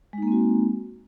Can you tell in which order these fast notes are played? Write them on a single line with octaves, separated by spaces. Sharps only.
G#3 D#4 A#3 C4 F#4